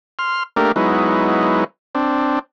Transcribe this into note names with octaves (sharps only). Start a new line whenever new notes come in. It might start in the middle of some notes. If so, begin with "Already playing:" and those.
C6 F6
A3 A#3 D4 G4 A#4
F#3 G#3 B3 D#4 E4
C4 D4